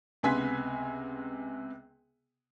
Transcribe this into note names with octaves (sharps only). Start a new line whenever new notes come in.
C#2 C3 B3 G#5 C6 B6